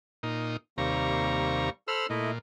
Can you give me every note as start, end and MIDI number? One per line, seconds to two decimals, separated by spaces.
0.23 0.57 46
0.23 0.57 63
0.78 1.70 39
0.78 1.70 48
0.78 1.69 55
0.78 1.69 58
0.78 1.70 82
0.78 1.69 85
1.88 2.06 69
1.88 2.07 72
1.88 2.06 83
1.88 2.07 88
1.88 2.06 89
2.10 2.39 46
2.10 2.31 57
2.10 2.31 64
2.10 2.31 75